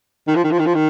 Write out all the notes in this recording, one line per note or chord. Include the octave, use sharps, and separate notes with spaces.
D#3
F3
D#3
F3
D#3
F3
D#3